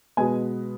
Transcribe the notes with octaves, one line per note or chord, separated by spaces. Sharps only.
B2 G#3 B3 G#5